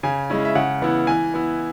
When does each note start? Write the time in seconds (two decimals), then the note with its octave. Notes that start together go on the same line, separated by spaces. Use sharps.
0.03 C#3 G#5
0.30 G#3 C#4 E4
0.45 E5
0.55 C#3 F#5
0.81 E3 B3 E4
1.07 E3 G#5
1.34 B3 E4